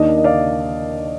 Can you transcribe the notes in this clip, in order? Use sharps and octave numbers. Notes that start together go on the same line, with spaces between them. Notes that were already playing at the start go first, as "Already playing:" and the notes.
Already playing: D#2 D#3 A#3 D4 D#5
D#5
D5 F5